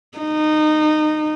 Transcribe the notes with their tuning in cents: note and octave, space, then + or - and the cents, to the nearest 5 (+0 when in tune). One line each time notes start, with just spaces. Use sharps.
D#4 -20